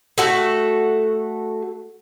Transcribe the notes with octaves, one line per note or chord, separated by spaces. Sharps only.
A3 F#4 A4